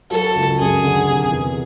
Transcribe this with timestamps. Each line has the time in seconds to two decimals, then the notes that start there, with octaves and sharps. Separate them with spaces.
0.11 F#3 A4
0.35 C#2
0.59 F#2 G#4
0.84 D3
1.08 C3
1.31 E2